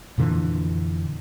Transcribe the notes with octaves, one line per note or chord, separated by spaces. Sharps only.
F2 A#2 D3 E3